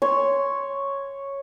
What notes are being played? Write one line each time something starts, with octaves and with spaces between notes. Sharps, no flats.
C#5 C6